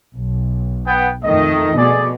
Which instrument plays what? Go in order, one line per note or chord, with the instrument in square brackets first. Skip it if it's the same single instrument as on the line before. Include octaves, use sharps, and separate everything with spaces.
[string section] B1
[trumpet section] B3 G5
[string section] F2 D#3 A3 [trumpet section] D#5
[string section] B2 [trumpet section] G#4 D5